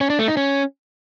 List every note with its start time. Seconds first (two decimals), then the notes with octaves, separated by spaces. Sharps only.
0.01 C#4
0.10 D4
0.19 A3
0.28 D#4
0.37 C#4